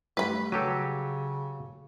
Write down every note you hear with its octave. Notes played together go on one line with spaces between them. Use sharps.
G3 A3 B4 B5
C#3 F#3 G4 A4 E6 D#7